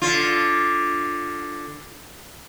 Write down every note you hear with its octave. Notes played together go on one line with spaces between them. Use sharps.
D3 F4